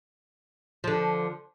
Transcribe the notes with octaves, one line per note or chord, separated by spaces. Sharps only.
D3 F3